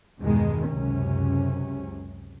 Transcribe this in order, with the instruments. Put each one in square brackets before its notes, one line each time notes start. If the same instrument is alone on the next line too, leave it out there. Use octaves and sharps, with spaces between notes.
[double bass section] E2 G2 B2 D#3 G#3
C#2 F#2 C3 C#4